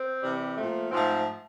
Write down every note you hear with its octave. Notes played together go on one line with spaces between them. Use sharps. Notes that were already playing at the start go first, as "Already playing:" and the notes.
Already playing: C4
C3 E3 G3
A#2 F3 A3
G#2 F3 A3 C4